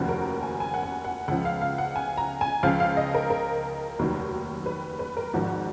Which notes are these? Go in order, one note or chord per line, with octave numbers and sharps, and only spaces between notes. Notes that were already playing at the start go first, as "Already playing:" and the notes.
Already playing: F1 D#2 C#3 F3 F#4
A#4
G#5
G#5
F#5
G#5
F#5
C#2 C#3 F3 F#5
F5
F5
F#5
G#5
A#5
G#5
C#2 C#3 F3 F5
F5
D#5
A#4
A#4
F1 D#2 D#3 F#3
B4
B4
A#4
G#1 G#2 F3 F#4